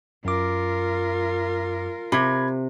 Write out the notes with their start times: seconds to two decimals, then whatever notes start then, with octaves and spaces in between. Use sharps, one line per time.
0.25 F#2 F4 A#4 D6
2.12 C3 B5 G#6